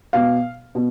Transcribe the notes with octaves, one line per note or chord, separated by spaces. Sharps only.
B2 F5
B2